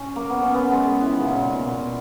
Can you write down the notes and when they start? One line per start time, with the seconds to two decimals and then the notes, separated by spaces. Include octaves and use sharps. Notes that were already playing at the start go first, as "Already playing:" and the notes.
Already playing: C#4
0.16 A#3
0.30 B3
0.42 C#4
0.54 B3
0.71 G#3
0.86 G#3
1.01 E3
1.10 D#3
1.19 C#3
1.28 A#2
1.37 B2
1.56 A#2
1.65 B2
1.74 A#2